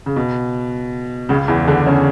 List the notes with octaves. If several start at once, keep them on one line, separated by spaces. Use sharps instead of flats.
C#3
B2
C#2 C#3
E2 E3
D3 D4
C#3 C#4